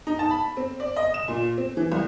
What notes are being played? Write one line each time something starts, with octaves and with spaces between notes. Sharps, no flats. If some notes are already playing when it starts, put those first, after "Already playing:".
D#4
A5
B5
C4
D5
D#5
E7
A#2
C4
E3
C2